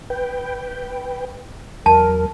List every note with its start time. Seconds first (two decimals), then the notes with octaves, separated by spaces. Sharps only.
0.10 B4 G5
1.86 E2 F#3 A#4 A5